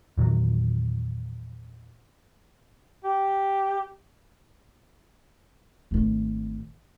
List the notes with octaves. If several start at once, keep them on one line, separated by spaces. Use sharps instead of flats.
E2 A#2 D#3 F#3
G4
G#1 A3